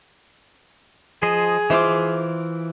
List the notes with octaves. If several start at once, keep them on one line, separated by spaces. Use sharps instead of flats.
F3 G#4 C5 D#5
E3 F4 C5 E5 D6